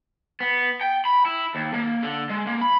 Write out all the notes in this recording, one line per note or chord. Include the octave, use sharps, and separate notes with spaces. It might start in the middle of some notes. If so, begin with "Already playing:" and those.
B3
G5
B5
E4
D#2
A#3
D3
G#3
A#3
B5